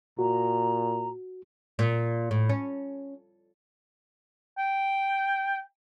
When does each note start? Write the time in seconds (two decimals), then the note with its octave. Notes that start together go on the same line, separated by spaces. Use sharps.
0.19 A#2 F#4 A#5
1.79 A#2
2.31 A2
2.49 C#4
4.58 G5